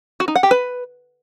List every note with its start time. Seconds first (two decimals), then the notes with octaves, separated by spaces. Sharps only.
0.20 F#4
0.28 D#4
0.36 F#5
0.43 G4
0.51 B4